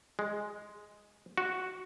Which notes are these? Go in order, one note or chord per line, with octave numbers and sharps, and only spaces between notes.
G#3
F#4